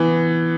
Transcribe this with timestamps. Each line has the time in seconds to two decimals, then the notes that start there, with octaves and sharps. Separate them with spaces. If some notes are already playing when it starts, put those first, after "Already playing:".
Already playing: E3 B3